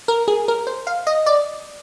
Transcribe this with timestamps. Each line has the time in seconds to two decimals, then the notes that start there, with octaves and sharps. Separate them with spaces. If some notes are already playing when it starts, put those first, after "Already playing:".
0.08 A#4
0.28 G#4
0.48 A#4
0.67 C5
0.87 F5
1.07 D#5
1.26 D5